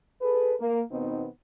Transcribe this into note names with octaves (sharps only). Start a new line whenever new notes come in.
G#4 A4 B4
A#3
D#2 B2 B3 C4 D#4